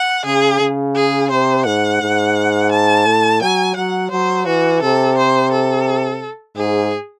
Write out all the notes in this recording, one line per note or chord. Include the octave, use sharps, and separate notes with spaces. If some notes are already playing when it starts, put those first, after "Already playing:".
Already playing: F#5
C#3 G#4
C#3
G#4
C3 C5
G#2 F#5
G#2
A5
A2
F#3 G#5
F#3 F#5
F#3 C5
E3 F#4
C3 A4
C5
A4
G#2 G#4